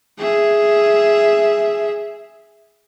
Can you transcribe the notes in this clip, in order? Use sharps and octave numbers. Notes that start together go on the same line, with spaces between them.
G#4 E5